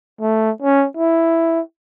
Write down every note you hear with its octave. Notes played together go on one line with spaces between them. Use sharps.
A3
C#4
E4